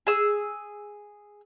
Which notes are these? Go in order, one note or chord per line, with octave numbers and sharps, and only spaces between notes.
G#4 E6